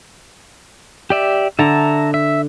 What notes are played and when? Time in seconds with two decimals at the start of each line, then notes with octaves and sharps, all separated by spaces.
1.10 G4 D5 E5
1.59 D3 E5 A5 A#5
2.14 E5